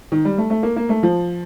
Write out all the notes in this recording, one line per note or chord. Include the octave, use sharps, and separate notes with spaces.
D#3
G3
A3
A3
A#3
A#3
A3
F3